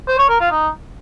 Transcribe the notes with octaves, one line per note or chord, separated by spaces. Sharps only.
C5
C#5
A#4
F4
D#4